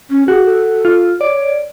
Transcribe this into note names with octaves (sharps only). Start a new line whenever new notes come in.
C#4
F#4 G#4
A4
F4
C#5 D5